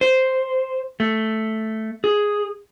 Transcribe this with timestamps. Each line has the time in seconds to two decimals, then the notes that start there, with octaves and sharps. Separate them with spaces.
0.01 C5
1.00 A3
2.04 G#4